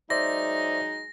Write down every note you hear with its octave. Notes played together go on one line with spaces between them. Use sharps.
F#3 G#3 D#4 C5 D5 E5 A#6